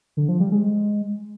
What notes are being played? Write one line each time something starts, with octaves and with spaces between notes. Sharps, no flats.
D3
F3
G3
G#3